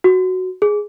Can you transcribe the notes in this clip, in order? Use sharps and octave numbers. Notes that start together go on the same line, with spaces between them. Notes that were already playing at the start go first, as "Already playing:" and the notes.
F#4
G#4